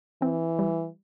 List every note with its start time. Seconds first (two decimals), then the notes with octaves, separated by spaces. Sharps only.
0.22 E3 C4
0.59 G3